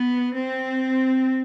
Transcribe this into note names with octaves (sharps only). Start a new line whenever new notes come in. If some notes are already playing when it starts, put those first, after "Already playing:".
Already playing: B3
C4